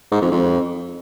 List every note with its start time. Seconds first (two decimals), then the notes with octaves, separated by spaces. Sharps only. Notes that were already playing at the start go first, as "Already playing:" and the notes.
0.12 G#2
0.22 F2
0.32 F2